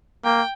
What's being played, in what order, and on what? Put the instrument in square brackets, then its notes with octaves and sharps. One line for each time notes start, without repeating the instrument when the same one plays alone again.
[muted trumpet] A#3 [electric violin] G5